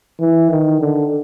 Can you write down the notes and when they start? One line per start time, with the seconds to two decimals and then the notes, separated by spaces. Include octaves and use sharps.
0.20 E3
0.50 D#3
0.80 D3